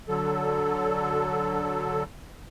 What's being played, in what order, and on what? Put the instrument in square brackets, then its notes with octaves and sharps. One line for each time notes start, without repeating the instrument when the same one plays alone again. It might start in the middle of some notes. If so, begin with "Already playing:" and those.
[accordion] D3 F#3 A4